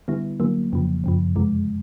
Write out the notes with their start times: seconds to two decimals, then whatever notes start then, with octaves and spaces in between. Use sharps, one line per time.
0.08 D3 G3 B3 E4
0.40 D3 F#3 A#3
0.72 F2 C#3 F3
1.04 F#2 C#3 F3
1.36 F2 C3 E3 G#3